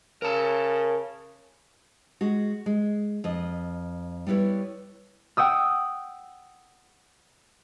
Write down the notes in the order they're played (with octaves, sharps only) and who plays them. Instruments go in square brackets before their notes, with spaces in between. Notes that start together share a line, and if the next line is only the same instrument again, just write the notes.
[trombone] C#3 [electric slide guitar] A#4 A5
[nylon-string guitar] G#3 F#4
G#3
F2 D#5
G3 B3 E4 B4 C#5
[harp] F#5 G5 D#6 E6